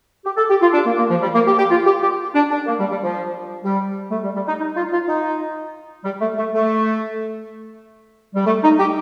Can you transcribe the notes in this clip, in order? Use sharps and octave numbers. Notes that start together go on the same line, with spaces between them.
G4
A4
G4
F4
D4
A#3
A#3
F3
G3
A#3
G4
G4
F4
G4
G4
D4
D4
A#3
G3
G3
F3
G3
A3
G3
G3
D#4
D#4
F4
F4
D#4
G3
A3
A3
A3
G3
A3
D#4
G4